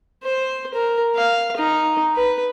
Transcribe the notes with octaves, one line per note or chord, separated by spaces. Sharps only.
C5
A#4
F5
D#4
B4